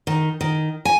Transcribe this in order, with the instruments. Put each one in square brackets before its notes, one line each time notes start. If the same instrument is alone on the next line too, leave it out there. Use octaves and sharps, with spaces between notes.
[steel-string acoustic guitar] D#3
D#3
G#5